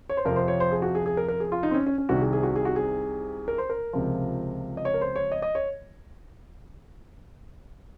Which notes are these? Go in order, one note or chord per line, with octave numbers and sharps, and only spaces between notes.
C#5
C5
F2 C3 F3 A#4
C5
C#5
C5
G#4
F#4
G#4
G#4
A#4
A#4
G#4
F4
D#4
C4
C#4
C#4
C#4
C2 C3 D#3 F#4
G#4
G#4
F#4
G#4
F#4
G#4
A#4
C5
A#4
C#2 C3 F3
D#5
C#5
A#4
C5
C#5
D#5
D#5
C#5